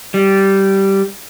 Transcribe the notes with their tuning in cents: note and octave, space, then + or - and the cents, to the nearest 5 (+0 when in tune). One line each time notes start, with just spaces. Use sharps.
G3 -10